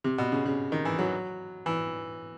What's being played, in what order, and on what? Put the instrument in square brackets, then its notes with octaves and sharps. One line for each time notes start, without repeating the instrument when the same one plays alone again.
[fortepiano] C3
B2
C#3
C#3
D#3
E3
F#3
E3